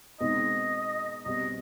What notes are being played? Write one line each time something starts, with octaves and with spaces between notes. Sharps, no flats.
B2 G#3 C4 D#4 D#5
B1 B2 G3 C4 G4 D#5